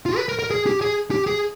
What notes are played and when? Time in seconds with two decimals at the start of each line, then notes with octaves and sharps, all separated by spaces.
0.06 F4
0.16 B4
0.28 A#4
0.39 A#4
0.51 G#4
0.66 G4
0.81 G#4
1.11 G4
1.26 G#4